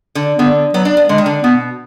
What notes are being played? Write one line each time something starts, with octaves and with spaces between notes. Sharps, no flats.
D3
D3 B3
F#3 B3
D4
B3
D3 G#3
D#3
D3
B2 B3